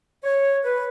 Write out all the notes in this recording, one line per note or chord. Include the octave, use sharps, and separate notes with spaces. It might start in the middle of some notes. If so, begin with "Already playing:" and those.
C#5
B4